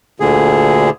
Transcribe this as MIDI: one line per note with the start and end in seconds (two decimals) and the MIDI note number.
0.20 0.90 38
0.20 0.90 46
0.20 0.90 50
0.20 0.90 68